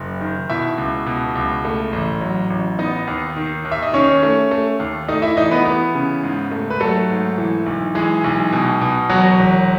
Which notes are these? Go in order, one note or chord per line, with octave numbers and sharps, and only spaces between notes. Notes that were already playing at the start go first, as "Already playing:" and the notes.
Already playing: F#1
D#3
B2 E4 E5
C#2
B2
C#2
A3
A1
F#3
A1
B3 D#4 D#5
D#2
D#3
D#2
E5
D#5
D#3 C#4 C#5
A3
A3
D#2
A3 D#4 D#5
E4 E5
E3 D#4 D#5
B3 B4
E3 B3 B4
C#3
G#2
A3
B4
F#3 A3 A4
G#2
E3
B1
E3 G#3 G#4
B1
B2
B2
E1 F#3 F#4
E1